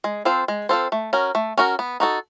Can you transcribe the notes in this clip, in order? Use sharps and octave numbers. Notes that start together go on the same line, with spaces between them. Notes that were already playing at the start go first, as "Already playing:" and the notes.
G#3
C4 F4 A4 C5
G#3
C4 F4 A4 C5
A3
C#4 F#4 A#4
A3
C#4 F#4 A#4
B3
D#4 F#4 A4